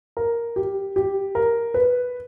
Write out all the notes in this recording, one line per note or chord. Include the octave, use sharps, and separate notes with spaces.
A#4
G4
G4
A#4
B4